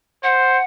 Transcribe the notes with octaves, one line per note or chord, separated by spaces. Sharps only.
C5 F#5